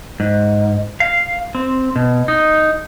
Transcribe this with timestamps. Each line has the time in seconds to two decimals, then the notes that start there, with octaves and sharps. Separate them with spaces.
0.20 G#2
1.00 F5
1.55 C4
1.96 B2
2.28 D#4